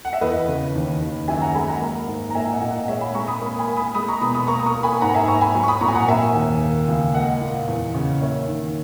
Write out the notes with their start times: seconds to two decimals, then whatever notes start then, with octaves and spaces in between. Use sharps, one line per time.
0.05 F#5
0.13 E5
0.21 E2 B4 D#5
0.48 C#3
0.75 D#2
1.02 D#2
1.28 F#2 E5 G#5
1.41 F#5 A#5
1.55 G#3 G#5 B5
1.68 F#5 A#5
1.81 A#3
2.08 G#2
2.30 A#5
2.35 A#2 E5 G#5
2.53 D#5 F#5
2.61 A#2
2.70 D#5 F#5
2.88 G#3 C#5 E5
3.01 G#5 B5
3.15 G#3 A#5 C#6
3.28 B5 D#6
3.42 A#3
3.59 G#5 B5
3.68 A#3
3.77 B5 D#6
3.95 G#3 B5 D#6
4.08 A#5 C#6
4.21 B2 B5 D#6
4.34 B5 D#6
4.48 A#3 A#5 C#6
4.59 D#6
4.66 A#5 C#6
4.74 A#3
4.83 G#5 B5
5.01 G#2 F#5 A#5
5.14 E5 G#5
5.28 G#2 A#5 C#6
5.41 G#5 B5
5.55 F#3
5.63 C#6
5.68 B5 D#6
5.81 A#2 A#5 C#6
5.88 G#5
5.95 F#5 A#5
6.08 A#3 E5 G#5
6.34 D#2
6.61 A#3
6.88 C#2
7.14 A#3 D#5 F#5
7.41 A#2
7.68 E2
7.94 C#3
8.21 A#3 C#5 E5
8.48 D#3